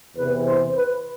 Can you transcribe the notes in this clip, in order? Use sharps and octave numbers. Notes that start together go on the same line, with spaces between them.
E2 C3 E3 B4
C5
B4